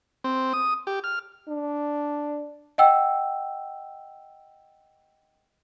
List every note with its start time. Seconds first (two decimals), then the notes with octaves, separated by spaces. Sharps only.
0.24 C4
0.53 D#6
0.87 G4
1.04 F6
1.48 D4
2.78 D#5 F#5 G5 E6